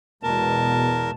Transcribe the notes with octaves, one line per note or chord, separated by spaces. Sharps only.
E2 B2 G#3 A#4 A5